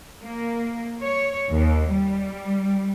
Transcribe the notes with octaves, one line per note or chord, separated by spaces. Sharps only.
A#3
C#5
D#2
G3